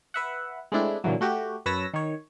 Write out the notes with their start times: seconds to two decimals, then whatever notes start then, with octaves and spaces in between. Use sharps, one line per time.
0.14 B4 E5 F#5
0.72 G#3 A3 C4 D4 E4
1.04 A#2 D3 E3 F#3
1.21 A3 F#4 G4
1.66 F#2 B4 C#5 A5 E6 A#6
1.94 D#3 C#5